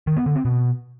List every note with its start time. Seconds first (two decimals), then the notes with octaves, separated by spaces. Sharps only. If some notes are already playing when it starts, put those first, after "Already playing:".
0.07 D#3
0.17 B3
0.26 D3
0.35 C4
0.45 B2